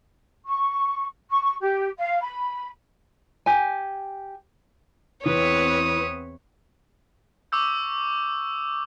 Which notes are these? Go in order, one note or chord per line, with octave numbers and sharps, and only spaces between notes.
C#6
C#6
G4
F5
B5
G4 G#5
E2 E3 C4 B4 C#5 D#6
C#6 D6 E6 G6